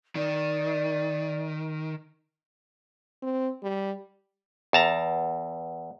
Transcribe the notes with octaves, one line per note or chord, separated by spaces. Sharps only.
D#3 D5
C4
G3
E2 A5 A#5